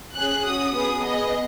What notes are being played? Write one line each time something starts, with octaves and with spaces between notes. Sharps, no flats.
C#4 G#4 F#6
C#4 F#4 D#6
B3 G#4 D#6
B3 G#4 D#5